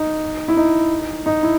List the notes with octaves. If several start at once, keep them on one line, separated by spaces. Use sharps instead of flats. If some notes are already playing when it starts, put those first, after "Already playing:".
Already playing: D#4
E4
D#4
D#4
E4